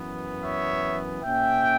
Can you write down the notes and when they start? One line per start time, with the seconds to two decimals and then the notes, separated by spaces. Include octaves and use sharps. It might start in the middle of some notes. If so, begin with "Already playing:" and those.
Already playing: F#2 E3 B3
0.42 C#5 E5
1.23 A#2 A#3 C#4 E5 G5